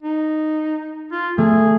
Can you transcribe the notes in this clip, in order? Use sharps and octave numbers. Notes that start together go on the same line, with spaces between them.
D#4
F4
A3 G#4